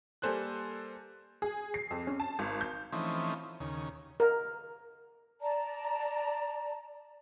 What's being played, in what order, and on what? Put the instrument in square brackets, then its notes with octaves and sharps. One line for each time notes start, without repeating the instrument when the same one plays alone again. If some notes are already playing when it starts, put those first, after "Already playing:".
[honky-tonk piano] G3 A#3 A4 C5 G#5 F#6
G#4
C7
F2
C#4
A5
G#1
G6
[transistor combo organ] E3 F3 A3 C4 C#4 D#4
D#2 C#3
[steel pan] A#4
[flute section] D5 A5 A#5